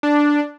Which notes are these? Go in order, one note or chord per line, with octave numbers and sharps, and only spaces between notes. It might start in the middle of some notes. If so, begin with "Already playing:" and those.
D4